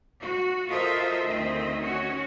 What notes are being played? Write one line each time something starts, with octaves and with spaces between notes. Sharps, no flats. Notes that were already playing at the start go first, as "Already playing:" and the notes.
F#4
F4 A4 A#4 C5 D#5 E5
D2 D#3 C4 D#5 E5
C#4 F#4 C#5